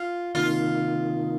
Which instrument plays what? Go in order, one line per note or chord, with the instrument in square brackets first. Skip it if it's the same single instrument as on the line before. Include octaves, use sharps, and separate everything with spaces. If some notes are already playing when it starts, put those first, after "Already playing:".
Already playing: [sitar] F4
[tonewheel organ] C3 D#3 A#3 D#4 [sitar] F4